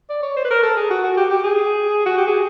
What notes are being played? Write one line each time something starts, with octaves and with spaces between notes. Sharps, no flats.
D5
C#5
C5
B4
A#4
A4
G#4
F#4
F#4
G4
G4
G#4
F#4
G4
G#4